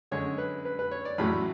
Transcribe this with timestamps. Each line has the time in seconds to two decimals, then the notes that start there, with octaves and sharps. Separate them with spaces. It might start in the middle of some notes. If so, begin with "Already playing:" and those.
0.11 F#2 D3 G#3 C#5
0.38 B4
0.65 B4
0.79 B4
0.91 C#5
1.05 D5
1.18 A1 A2 F#3 A3 B5